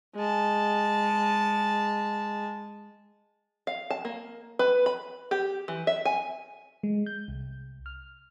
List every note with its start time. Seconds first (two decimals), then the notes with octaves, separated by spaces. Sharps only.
0.16 G#3 A5
3.67 F5
3.91 A5
4.05 A#3
4.59 B4
4.86 B5
5.31 G4
5.68 E3
5.87 E5
6.05 G#5
6.83 G#3
7.06 G6
7.28 C2
7.86 F6